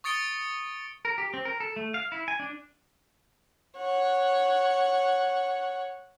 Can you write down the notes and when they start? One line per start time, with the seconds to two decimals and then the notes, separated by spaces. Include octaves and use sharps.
0.04 C#6 D#6 A6 C#7 D7 G7
1.05 A#4
1.18 G4
1.34 C4
1.45 A#4
1.60 A4
1.76 A3
1.94 F5
2.12 E4
2.28 G#5
2.40 D4
3.78 C#5 F#5